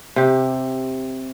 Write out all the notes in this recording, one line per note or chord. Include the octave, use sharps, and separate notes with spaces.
C3 G4